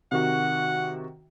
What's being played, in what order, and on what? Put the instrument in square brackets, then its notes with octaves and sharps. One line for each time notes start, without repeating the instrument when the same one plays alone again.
[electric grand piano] C3 D#3 F#4 [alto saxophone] F#5